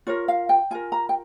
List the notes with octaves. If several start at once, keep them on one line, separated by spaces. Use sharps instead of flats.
F4 A#4 C#5
F5
G5
F4 A#4 G#5
A#5
G5